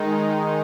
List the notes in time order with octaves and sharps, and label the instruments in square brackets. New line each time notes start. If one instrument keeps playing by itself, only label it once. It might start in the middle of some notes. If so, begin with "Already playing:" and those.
Already playing: [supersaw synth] D#3 G#3 D#4